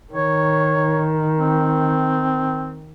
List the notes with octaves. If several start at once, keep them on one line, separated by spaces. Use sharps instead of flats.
D#3 C#5
C4